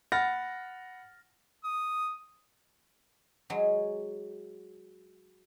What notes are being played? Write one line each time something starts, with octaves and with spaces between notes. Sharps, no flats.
F#5 B5 F6 A6 A#6
D#6
F#3 G#3